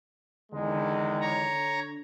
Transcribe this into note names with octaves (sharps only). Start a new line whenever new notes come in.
E2 D3 D#3 G#3
C#5 A#5